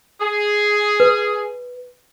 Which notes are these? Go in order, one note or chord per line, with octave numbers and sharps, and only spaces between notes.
G#4
B4